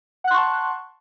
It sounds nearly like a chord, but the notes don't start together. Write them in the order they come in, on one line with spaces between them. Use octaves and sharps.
F#5 F#6 C6 C#6 A5